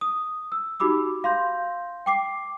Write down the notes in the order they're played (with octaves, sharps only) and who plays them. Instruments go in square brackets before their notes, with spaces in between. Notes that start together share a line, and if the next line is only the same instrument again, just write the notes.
[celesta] D#6
E6
D#4 F#4 G4 B5 D6 E6
F5 C6 G6 A#6
G5 D6 C7